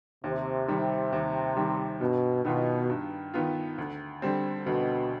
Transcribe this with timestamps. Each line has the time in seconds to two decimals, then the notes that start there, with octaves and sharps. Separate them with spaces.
0.24 D#2 C3
0.68 D#3 G3
1.13 D#2
1.57 D#3 G3
2.01 G2 B2
2.45 B2 D#3 B3 F4
2.89 G2
3.34 D#3 B3 F4
3.78 D2
4.22 D3 G3 C4
4.66 D2 B2